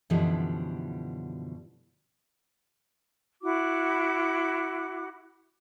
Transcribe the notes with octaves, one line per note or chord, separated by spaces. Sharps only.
F#2 B2 D3 E3 F3 G3
E4 F#4 D6